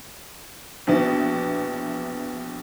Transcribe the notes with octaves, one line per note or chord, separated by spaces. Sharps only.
A#1 B2 E3 B3